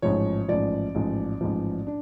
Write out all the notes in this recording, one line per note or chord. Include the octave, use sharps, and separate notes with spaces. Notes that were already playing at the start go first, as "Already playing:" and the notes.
A1 G#2 F3 C#5
A1 G#2 F3 D5
A1 G#2 F3
A1 G#2 F3
D4